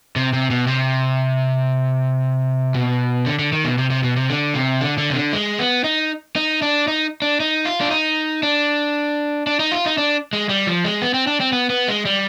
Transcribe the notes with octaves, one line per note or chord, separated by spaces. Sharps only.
C3
C3
B2
C3
B2
D3
D3
D#3
B2
C3
C3
B2
C3
D3
C3
D3
D3
C3
D3
G#3
B3
D#4
D#4
D4
D#4
D4
D#4
F4
D4
D#4
D4
D4
D#4
F4
D#4
D4
G#3
G3
F3
G#3
B3
C4
D4
C4
B3
B3
G#3
G3